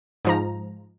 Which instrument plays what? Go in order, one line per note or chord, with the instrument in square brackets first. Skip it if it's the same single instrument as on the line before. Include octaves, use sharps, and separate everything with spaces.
[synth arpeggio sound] G#2 F3 A#5